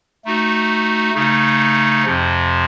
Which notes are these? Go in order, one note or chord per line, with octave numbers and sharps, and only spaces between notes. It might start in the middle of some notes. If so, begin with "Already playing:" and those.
A3 D#4 F#4
C#3 A3 D#4
F2 C3 F3